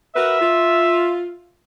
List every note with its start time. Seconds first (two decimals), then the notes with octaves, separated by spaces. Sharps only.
0.15 F#4 A#4 B4 E5
0.41 F4